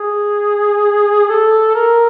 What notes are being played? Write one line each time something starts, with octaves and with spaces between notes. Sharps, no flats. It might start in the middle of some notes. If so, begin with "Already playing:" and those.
Already playing: G#4
A4
A#4